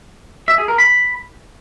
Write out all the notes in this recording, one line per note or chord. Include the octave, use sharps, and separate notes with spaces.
E5
G#4
A#4
B5